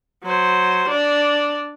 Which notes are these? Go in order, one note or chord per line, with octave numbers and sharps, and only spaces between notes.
F#3 C5
D4 D5